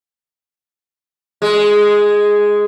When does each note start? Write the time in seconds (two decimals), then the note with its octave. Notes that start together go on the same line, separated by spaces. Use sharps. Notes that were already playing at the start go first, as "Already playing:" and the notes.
1.42 G#3